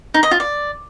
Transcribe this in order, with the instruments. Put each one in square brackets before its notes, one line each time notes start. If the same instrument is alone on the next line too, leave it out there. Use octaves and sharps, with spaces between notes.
[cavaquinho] D#4
D#5
F4
D5